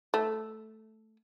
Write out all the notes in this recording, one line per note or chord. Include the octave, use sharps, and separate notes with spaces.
A3